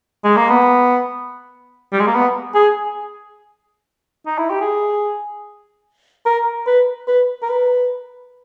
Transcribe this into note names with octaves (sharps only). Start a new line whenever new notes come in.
G#3
A#3
B3
G3
G#3
A#3
B3
G#4
D#4
E4
G4
G#4
A#4
B4
B4
A#4
B4